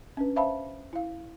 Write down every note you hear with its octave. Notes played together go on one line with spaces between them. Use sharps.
C#4 D4 B4
C5 E5 F5 A5 B5
E4 F5